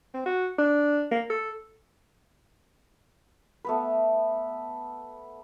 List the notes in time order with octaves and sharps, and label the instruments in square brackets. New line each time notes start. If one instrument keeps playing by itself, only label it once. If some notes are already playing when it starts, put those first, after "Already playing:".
[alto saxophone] C4
F#4
D4
A#3
A4
[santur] A3 B3 B4